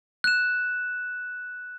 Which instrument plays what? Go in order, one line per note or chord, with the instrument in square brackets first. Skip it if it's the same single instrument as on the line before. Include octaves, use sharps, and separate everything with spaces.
[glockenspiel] F#6 E7